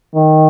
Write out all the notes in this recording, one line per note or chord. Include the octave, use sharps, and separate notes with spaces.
D#3